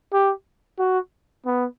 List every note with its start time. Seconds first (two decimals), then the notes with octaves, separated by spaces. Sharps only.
0.13 G4
0.79 F#4
1.46 B3